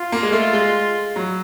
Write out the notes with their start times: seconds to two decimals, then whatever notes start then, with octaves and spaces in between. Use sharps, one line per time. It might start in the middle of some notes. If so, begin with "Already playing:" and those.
Already playing: F4
0.12 A#3
0.23 G#3
0.32 A3
0.53 G#3
1.16 F#3